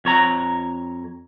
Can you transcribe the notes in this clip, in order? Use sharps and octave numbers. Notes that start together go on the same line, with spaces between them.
F2 C#5 A#5